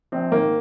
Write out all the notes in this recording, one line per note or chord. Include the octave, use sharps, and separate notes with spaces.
A#1 C4
G#2 D#3 A#3